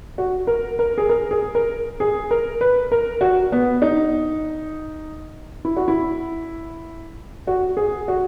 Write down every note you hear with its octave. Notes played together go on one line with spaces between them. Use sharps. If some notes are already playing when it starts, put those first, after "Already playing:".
F#4
A#4
A#4
G#4
A#4
G#4
A#4
G#4
A#4
B4
A#4
F#4
B3
D#4
E4
F#4
E4
F#4
G#4
F#4